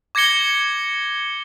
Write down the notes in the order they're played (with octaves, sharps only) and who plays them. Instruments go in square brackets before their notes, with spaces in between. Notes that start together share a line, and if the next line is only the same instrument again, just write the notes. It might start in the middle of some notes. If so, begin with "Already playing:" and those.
[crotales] D6 G#6 A#6 C#7 G7